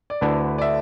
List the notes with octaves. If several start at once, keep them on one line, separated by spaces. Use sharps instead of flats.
D5
D2 D3 A3 E4 B4
D5
E5